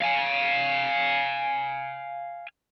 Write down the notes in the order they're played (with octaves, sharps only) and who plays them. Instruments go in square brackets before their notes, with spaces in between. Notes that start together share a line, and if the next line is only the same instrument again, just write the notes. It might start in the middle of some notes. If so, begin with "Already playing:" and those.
[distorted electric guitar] F5 G#5